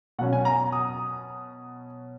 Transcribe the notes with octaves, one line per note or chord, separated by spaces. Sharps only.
B2 F#3 C#4 F#5
G#5
A#5
D#6